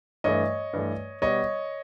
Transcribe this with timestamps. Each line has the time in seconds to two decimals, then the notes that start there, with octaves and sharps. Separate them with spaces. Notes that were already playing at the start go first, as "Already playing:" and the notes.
0.24 G2 E3 A3 C#5 D#5
0.73 G2 E3 A3
1.22 B2 G3 B3 C#5 D#5